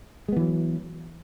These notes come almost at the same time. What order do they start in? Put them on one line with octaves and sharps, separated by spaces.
G#3 B3 E3 F#3